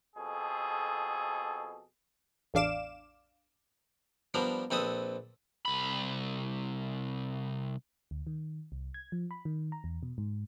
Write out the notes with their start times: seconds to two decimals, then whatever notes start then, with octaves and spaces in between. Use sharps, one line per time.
0.16 F2 B2 G#4 A4
2.54 A1 E2 D4 F5 D6 E7
4.34 F3 G3 B3 D4 A#4
4.71 A#1 C4 A4 B4 D#6
5.65 C2 B5
8.11 D2
8.27 D#3
8.72 C2
8.94 G#6
9.12 F3
9.31 B5
9.45 D#3
9.72 A#5
9.84 E2
10.03 B2
10.18 G#2